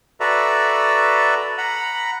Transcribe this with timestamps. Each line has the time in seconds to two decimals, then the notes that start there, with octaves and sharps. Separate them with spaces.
0.20 F#4 A4 B4 D5 E5 A#5
1.58 F#5 A#5 B5